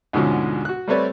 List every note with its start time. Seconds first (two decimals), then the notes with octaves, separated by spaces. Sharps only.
0.13 D2 G#2 B2 F3 G#3 C#4
0.65 F#4 F#6
0.88 G3 A3 C4 B4 C#5 D5